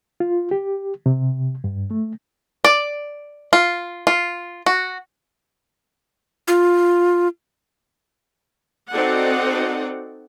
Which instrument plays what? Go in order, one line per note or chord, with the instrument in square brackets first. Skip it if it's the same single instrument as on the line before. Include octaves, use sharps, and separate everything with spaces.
[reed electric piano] F4
G4
C3
G2
A3
[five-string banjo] D5
F4
F4
F#4
[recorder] F4
[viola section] C4 D#4 F#4 A4 D5 F#5